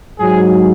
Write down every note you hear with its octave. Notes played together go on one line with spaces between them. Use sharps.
G#2 F#3 G#4